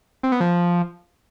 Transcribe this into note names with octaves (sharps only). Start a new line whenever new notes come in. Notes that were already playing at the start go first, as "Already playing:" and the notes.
C4
B3
F3